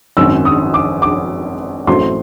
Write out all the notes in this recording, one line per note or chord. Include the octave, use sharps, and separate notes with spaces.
G#1 F#2 D#3 E6
D#6
D6
D6
A1 A2 F#3 A3 C4 C6